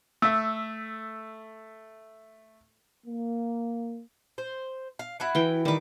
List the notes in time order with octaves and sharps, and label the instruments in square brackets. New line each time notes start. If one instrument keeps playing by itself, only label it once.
[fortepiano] A3 E5 [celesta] E6
[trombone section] A#3
[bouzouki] C5
F5
E4 F#4 F#5
[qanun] E3 G5
[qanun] D#3 D6 [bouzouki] G3 B4